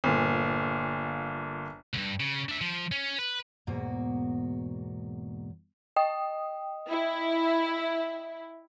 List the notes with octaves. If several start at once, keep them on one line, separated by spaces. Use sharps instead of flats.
G1 A#2
C#2 G2
C#3
D4 E5
F3
C#4
B4
E2 G#2 B2 A#3 F#4
D#5 G5 D#6
E4